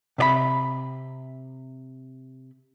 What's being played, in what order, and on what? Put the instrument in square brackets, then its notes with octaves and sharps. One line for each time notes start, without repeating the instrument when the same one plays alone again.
[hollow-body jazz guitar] C3 D5 B5